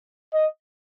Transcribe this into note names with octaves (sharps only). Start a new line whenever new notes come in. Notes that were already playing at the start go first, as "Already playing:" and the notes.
D#5